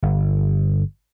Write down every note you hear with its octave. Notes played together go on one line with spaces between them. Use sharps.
G1